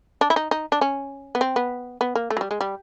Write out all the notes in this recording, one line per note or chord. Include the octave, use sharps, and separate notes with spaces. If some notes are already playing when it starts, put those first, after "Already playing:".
D4
E4
D#4
D#4
D4
C#4
B3
C4
B3
B3
A#3
A3
F#3
G3
G#3
G3